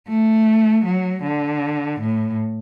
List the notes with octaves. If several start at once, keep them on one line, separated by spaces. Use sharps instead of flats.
A3
F#3
D3
A2